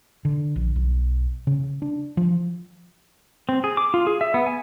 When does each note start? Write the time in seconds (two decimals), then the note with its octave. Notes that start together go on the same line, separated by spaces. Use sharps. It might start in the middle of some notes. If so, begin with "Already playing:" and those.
0.25 D3
0.56 A#1
0.76 B1
1.47 C#3
1.82 D4
2.17 F3
3.49 C4
3.64 G#4
3.77 D6
3.94 F4
4.07 G#4
4.21 E5
4.34 B3
4.46 G#5